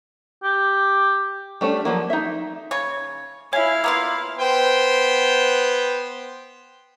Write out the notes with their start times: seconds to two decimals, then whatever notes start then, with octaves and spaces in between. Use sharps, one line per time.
0.44 G4
1.61 G3 A3 C#4 D4
1.85 F3 F#3 A#3
2.10 D#4 E5
2.71 C#3 C#5
3.53 E4 C#5 E5 F5 G#5
3.84 A#3 B3 F4
4.39 B3 C5 G5